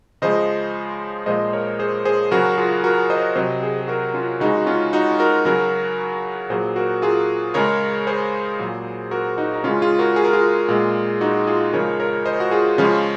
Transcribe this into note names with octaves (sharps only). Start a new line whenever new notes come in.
C#3 F3 G#3 C5 D#5
A#2 F3 G#3 C5 D#5
C5
A#4 C#5
G#4 C5
G#4 C5
C#3 F#3 F#4 A#4
F4 G#4
F#4 A#4
C5 D#5
C3 F#3 C5 D#5
G#4 C5
G#4
F#4 A#4
C#4 F4
C#3 G#3 D#4 F#4
F#4
C#4 F4
D#4 F#4
F#4 A#4
C#3 F#3 F#4 A#4
A#2 F#3 G#4 C5
F#4 A#4
F4 G#4
C#3 G#3 A#4 C#5
G#4 C5
A#2 F#3
F#4 A#4
D#4 F#4
D#4
C#3 G#3 C#4 F4
F4 G#4
F#4 A#4
G#4
A#4
F4 G#4
A#2 G#3
D#4 F#4
F4 G#4
C#3 F3 G#3 A#4 C#5
A#4 C#5
C5 D#5
F#4
F4 G#4
C#3 F3 G#3 C#4 F4